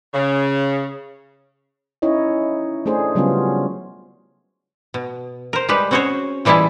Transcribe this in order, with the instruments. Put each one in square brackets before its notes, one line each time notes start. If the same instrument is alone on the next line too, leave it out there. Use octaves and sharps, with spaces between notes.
[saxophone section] C#3
[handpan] C#4 D#4 E4 C#5 D#5
A3 D4 G#4 C5
C#3 F#3 G3 B3 C#4 F4
[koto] B2
A#4 C5
G3 G#3 G4 B4
C4 C#4 F#4 G#4 C5 C#5
A#2 E3 G3 G#3 E4 A5